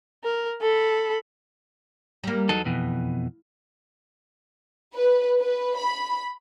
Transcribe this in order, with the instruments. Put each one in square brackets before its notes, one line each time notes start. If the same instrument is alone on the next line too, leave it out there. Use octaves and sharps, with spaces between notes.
[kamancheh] A#4
A4 B5
[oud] G3 A#3
[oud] E2 [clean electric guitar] F#3 D#4 A4
[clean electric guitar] F2 B2 E3
[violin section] B4
B4
B5